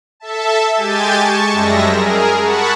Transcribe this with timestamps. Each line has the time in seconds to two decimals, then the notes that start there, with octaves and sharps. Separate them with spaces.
0.20 A4 E5 A5
0.75 G#3 G4 G#5 G6 A6
1.16 A5 C#6
1.51 F#2 G3 G#3 E5 A#6
1.86 G#4 A#4
2.40 F#5 A5 B5 C#6